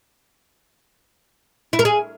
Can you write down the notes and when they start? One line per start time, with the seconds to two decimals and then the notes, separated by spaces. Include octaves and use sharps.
1.73 E4
1.79 A#4
1.85 G#4